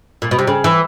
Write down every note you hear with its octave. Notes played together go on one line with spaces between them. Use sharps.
A#2
B2
C3
C#3
E3